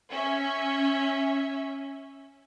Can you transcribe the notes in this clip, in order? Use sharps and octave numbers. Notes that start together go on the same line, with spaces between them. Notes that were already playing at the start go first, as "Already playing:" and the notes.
C#4 E5